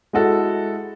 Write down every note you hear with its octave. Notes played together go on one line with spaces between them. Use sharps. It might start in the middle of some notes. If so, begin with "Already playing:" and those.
G#3 E4 F#4 A4